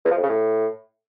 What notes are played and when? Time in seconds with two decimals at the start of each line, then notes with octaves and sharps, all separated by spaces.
0.05 E2
0.11 F3
0.17 F2
0.23 C#3
0.29 A2